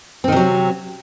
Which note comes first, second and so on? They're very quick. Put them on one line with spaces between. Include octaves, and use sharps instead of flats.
C4 D#3 C3 F#3